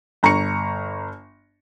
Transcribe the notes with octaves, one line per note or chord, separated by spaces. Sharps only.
G1 A#5 C#6 C#7